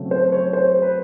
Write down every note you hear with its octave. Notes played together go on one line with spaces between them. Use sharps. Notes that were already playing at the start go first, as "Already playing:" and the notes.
Already playing: C#3 F#3 A3 C4
C5
C#5
C5
B4